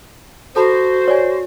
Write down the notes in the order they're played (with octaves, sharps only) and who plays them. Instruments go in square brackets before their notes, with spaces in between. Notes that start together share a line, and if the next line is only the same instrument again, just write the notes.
[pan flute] F#4 [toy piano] A4 A5 B5 [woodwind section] C5
[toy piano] C#5 D5 G#5